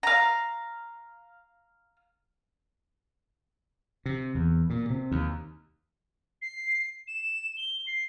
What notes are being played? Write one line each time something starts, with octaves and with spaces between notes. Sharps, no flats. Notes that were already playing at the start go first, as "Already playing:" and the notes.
F5 A#5
C3
E2
A#2
C3
D#2
C7
E7
G7
C7